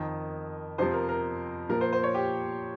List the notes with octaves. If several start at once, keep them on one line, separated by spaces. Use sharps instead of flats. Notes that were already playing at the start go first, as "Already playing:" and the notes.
Already playing: F2 D#3
F2 C3 F3 C5
A#4
A#4
A#2 F3 A#4
C5
C5
C#5
G4